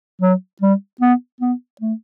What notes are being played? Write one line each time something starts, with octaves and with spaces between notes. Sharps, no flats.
F#3
G3
B3
B3
A3